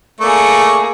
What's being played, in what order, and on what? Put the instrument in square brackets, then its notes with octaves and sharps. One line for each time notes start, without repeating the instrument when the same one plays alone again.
[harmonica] A3 D5 C#6 [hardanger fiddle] A#3 G#4